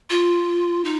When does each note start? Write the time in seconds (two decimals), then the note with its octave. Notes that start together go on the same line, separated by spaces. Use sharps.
0.10 F4
0.85 D#4